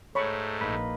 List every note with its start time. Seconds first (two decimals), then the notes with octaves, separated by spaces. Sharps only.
0.15 G#2 A3 C#5 B5 C#6
0.61 A#1 A#3 D#4 B4